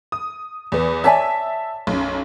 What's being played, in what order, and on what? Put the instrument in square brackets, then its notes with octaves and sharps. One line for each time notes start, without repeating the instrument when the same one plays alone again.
[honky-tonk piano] D#6
E2 B3
[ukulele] C#5 D5 G#5 [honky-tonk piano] E5 A5 B6
[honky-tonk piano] B1 F#2